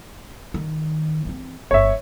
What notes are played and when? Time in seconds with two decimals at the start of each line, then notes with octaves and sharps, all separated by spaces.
0.54 D#3
1.25 E3 C4
1.71 G1 C#5 E5